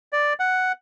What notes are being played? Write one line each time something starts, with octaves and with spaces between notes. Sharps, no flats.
D5
F#5